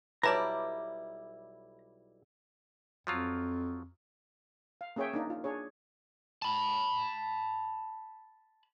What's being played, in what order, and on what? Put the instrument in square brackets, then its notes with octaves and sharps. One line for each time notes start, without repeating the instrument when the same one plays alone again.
[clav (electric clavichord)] B1 G3 [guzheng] E4 D5 [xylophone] B4 C#5 A5 [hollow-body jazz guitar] A#5
[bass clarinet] F2 [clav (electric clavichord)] F3 F#3 F4
[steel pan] F5
A#3 C#4 G#4 C#5 E5 G5
A#3 D4 D#4
F4
D4 G#4 C#5
[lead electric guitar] A5 B5